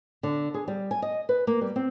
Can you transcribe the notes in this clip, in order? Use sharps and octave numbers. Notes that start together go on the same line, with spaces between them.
D3
G#4
G3
G#5
D#5
B4
A#3
G3
C4